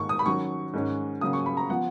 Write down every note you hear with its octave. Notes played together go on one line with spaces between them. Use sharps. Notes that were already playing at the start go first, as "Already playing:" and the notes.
Already playing: G#2 D#3 A#3 C#6
D#6
B5
D#3 F#3 C#4 C#6
G#2 D#3 G#3 C#4
C#3 F#3 A#3 C#4 D#6
C#6
B5
A#5
F3 B3 F4 F#5